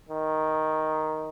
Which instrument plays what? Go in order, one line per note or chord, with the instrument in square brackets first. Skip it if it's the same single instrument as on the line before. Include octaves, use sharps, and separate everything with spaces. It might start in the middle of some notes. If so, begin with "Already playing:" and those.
[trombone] D#3